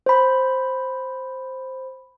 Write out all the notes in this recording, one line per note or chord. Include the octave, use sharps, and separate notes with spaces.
C5 B5